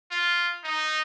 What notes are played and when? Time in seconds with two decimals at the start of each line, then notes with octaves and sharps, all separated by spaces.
0.11 F4
0.64 D#4